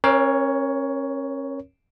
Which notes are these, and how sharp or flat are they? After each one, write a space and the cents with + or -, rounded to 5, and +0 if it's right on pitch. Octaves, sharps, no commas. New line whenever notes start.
C#4 -35 A#4 +15 C#5 +10